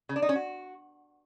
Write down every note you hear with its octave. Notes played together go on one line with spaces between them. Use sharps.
C#3
D4
D#4
C#4
F#4